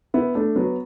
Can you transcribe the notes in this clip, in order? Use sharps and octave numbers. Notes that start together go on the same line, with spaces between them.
B3 E4
A3 D4
F#3 B3